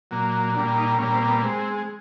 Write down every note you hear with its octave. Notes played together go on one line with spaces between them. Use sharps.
A#2 F#3 A#3
A#2 G3 A#3 D4
D#4
A#2 G3 A#3 C#4
C4
B3
G#3 C4